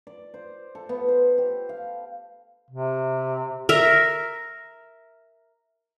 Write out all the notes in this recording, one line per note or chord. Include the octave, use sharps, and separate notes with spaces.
D5
C5
A4
B3
C5
G4
F5
C3
A#4 E5